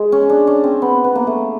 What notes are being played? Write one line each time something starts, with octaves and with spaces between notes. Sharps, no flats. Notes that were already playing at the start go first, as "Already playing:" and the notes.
Already playing: G#3
C#4
D4
C#4
C4
B3
B3
A#3
A3